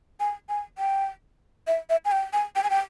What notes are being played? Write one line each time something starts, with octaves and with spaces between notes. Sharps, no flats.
G#5
G#5
G5
E5
E5
G#5
G5
G#5
G5
G#5
G5